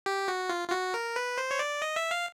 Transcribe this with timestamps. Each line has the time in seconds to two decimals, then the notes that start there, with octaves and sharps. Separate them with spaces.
0.06 G4
0.28 F#4
0.49 F4
0.68 F4
0.71 F#4
0.94 A#4
1.16 B4
1.38 C5
1.51 C#5
1.59 D5
1.82 D#5
1.96 E5
2.11 F5